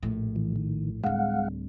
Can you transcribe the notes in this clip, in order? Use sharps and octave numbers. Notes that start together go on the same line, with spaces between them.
A#1 A2
E3
D#3
D1 G3 G#3 F5 F#5